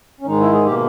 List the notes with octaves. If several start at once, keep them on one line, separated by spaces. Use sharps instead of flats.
C#4
G#2 D#3 G#3 D#4
E4
G#4
B2 A#3 G4